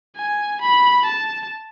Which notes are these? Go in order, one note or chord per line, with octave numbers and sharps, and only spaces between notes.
G#5
B5
A5